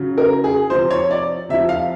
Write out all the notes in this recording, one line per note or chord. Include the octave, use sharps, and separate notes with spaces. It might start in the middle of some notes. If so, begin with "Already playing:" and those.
Already playing: C#3 F#3
A#4
G#4
C3 F3 C5
C#5
D5
C3 F3 E5
F5